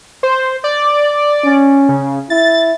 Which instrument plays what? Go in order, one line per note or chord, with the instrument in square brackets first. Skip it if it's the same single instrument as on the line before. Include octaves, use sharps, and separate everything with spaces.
[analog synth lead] C5
D5
[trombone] C#4
[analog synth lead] C#3
[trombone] E4 [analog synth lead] A6